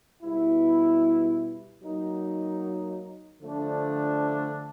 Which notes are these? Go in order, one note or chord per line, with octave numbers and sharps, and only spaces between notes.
B2 G3 B3 E4
F#3 A#3 D#4
D3 F3 A3 D4